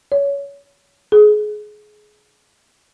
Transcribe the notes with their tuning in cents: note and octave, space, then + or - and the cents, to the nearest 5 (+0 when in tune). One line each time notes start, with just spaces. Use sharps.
C#5 +25
G#4 +25